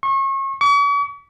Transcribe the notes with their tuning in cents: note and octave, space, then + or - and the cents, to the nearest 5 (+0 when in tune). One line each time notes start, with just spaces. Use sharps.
C#6 -35
C#6 +45